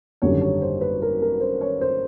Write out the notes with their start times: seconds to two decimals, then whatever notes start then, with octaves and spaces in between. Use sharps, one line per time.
0.22 G#1 F#2 D3 G3 C#5
0.41 C#5
0.62 C5
0.81 B4
1.02 A#4
1.22 A#4
1.41 C5
1.61 C#5
1.81 C5